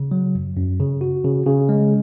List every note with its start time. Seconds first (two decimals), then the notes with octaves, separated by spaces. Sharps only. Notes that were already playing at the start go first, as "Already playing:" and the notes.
Already playing: C#3
0.11 F#3
0.35 F#2
0.57 F#2
0.80 C#3
1.01 F#4
1.25 C#3
1.46 C#3
1.69 G#3